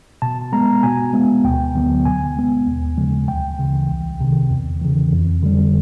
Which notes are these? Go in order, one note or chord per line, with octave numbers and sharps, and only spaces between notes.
B2 A5
G#3 B3 A#5
B2 G#5
G#3 B3
D2 G5
D3 F#3 B3
B2 G#5
G#3 B3
D#2
C#3 F3 G#3
D2 G5
C#3 E3
C2
C3 D#3
E2
C#3 E3
F2
D3 G3